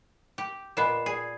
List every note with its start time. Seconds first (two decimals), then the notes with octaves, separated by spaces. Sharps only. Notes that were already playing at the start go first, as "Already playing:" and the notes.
0.38 G4
0.77 A#2 B3 D#5 C7 E7
1.06 G#4 D5 C7